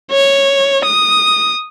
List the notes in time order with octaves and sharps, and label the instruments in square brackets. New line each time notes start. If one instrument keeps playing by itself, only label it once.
[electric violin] C#5
D#6